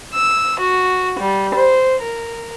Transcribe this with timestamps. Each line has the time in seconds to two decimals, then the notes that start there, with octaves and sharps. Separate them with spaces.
0.14 E6
0.59 F#4
1.19 G3
1.54 C5
2.01 A#4